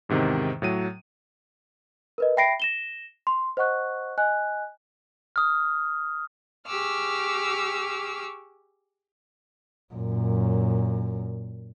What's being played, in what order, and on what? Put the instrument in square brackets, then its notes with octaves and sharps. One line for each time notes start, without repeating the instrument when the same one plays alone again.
[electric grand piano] E2 G#2 C3 D#3
A2 F#3 D#7
[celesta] A#4 B4 D#5
E5 G5 B5 A#6 C7 D7
A#6 E7 G7
C6
C5 D#5 F#5 C#6 F#6
D#5 G#5 F#6
[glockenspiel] D#6 F6
[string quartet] G4 G#4 C#6 D6 E6 F6
[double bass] F#2 A#2